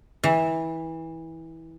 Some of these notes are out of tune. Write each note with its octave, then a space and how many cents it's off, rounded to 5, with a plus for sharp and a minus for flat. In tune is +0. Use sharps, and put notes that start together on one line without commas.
E3 -20